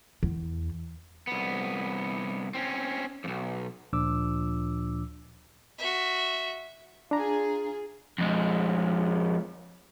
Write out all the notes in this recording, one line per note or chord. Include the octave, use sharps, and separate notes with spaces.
E2
C2 B3
C4 C#4
B1 F2
D2 A#2 F3 D4 D6 E6
F#4 E5
D4 F4 G#4 A#5
F2 G#3